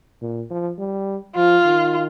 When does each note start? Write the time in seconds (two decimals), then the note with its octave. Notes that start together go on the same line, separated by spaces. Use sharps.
0.22 A#2
0.51 F3
0.78 G3
1.36 F3 F4
1.65 D#3